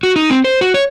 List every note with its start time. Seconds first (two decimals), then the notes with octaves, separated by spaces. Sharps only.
0.03 F#4
0.16 D#4
0.30 C4
0.44 C5
0.61 F#4
0.74 C#5